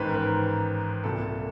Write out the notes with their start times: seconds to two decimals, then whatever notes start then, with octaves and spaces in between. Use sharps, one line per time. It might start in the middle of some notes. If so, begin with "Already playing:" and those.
Already playing: A1 G#2 D#3 B4 C5
0.09 A#4
0.14 B4
1.04 C2 A#2 A4